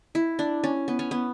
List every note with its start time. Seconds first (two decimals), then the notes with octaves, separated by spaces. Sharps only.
0.15 E4
0.39 D4
0.64 C#4
0.88 B3
0.99 C#4
1.11 B3